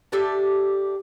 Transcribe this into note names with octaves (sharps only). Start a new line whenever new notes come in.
D4 G4 A4 E5